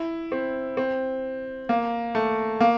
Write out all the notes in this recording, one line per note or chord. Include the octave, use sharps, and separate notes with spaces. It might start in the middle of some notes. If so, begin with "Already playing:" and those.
Already playing: E4
C4
C4
A#3
A3
A#3